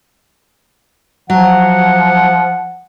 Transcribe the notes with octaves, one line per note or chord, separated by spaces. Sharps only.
F3 F#3 F#5